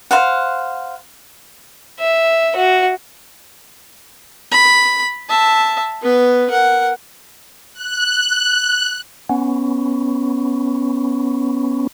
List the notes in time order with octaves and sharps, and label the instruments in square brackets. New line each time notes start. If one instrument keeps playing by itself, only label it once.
[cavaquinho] C5 F5 F#5
[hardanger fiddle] E5
F#4
[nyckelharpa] B5
E5 A5
B3 B4
A#4 F#5
[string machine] F#6
[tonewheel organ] B3 C#4